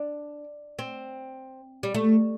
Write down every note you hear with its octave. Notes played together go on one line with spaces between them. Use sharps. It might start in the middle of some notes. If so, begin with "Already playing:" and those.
Already playing: D4
C4
G3
A3